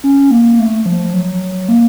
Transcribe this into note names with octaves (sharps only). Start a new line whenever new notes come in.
C#4
A#3
A3
F3
F#3
A#3